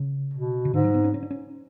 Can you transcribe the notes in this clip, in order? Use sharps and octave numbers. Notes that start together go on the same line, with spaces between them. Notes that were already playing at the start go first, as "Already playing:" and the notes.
Already playing: C#3
B2
C#3
G#2 D3
F#3
B3
C#4
C#4
D4
C#4